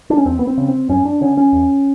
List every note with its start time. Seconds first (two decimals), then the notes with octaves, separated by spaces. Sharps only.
0.10 D4
0.18 C#4
0.25 E2 C4
0.39 B3
0.47 C4
0.57 C#3
0.68 C4
0.89 F#2 C#4
1.05 D4
1.21 D3 C#4
1.37 C#4
1.53 E2